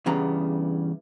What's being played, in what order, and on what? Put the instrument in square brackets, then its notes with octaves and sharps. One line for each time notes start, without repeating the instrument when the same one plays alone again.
[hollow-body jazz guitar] E2 G2 C#3 G3 B3 A#5